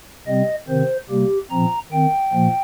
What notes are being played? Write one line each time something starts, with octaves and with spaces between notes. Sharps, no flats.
C3 G3 C4 D#5
C3 D#3 C4 C5
C3 G3 A#3 G4
A#2 F3 C4 A#5
D#3 C4 G5
A#2 F3 A#3